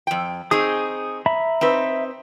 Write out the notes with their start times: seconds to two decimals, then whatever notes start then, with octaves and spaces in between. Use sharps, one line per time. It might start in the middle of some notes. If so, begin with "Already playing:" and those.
0.07 F2 G5
0.51 C4 D#4 G#4 C#6 D#6
1.26 E5 A#5 B5
1.61 C4 D#4 B4